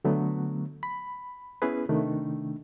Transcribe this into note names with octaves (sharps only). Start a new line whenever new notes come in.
D3 F#3 A3 B3
B5
B3 C#4 E4 G#4 B4
C3 D#3 A3 D4